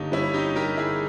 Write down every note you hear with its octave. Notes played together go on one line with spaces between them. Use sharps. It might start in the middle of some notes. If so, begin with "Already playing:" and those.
Already playing: G1 A#3 C#4 D#4 G4
G3 C#4 E4
D#4 G4
G3 G4 A#4
E4 G#4